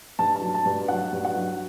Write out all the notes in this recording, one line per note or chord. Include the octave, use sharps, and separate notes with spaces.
G2 A5
A5
F#3
A5
G2
F#3 F#5
G2
F#5
F#3